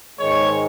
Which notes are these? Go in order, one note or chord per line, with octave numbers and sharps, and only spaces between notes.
G#2 D#3 G#3 C#5